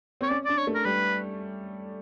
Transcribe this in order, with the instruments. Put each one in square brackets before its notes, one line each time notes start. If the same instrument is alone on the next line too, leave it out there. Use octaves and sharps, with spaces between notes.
[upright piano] C4 [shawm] C#5
[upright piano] C#4 [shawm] D5
[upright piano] D4 [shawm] D5
[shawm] C#5
[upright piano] A3
[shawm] A#4
[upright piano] G3 [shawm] B4